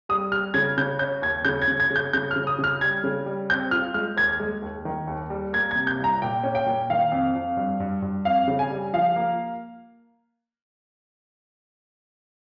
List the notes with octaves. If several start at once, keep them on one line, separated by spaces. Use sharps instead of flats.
G3 D#6
G3 F6
C#3 G#6
C#3 G6
C#4 G6
D#2 G#6
C#3 G6
G#6
C#3
G#6
C#3
G6
C#3 G6
F6
C#3
D#6
C#3 F6
G3 G#6
C#3
G3
C4 G6
F4 F6
G#3 F6
D#2 G#6
G#3
D#2
D#3
D#2
G3
A#3 G#6
C3 G#6
G6
C2
A#5
A#2 G5
C#4
G5
A#2
D#3 F5
F2
F2
G2
G2
G2
F2 F5
C#3
G#5
G3
F3 F5
A#3